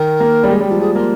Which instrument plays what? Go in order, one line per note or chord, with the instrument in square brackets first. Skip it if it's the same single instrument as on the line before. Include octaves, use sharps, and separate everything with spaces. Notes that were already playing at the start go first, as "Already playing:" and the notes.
Already playing: [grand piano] D#3 [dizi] A#4
[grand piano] A#3
G3
G#3
G3
[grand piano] F3 [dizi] G4
[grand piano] F3 [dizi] G#4
[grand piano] A#3 [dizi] F4